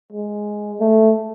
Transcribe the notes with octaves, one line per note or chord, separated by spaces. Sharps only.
G#3
A3